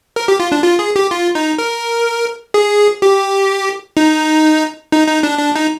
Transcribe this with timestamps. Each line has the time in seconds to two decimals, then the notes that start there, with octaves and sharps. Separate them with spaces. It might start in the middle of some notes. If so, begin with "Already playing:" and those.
0.16 A#4
0.28 G4
0.40 F4
0.52 D4
0.64 F4
0.79 G#4
0.96 G4
1.11 F4
1.35 D#4
1.58 A#4
2.54 G#4
3.02 G4
3.97 D#4
4.92 D#4
5.08 D#4
5.23 D4
5.39 D4
5.55 D#4